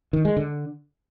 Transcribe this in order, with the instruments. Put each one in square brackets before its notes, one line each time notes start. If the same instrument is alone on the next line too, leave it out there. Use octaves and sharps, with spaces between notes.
[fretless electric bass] D#3
G#3
D3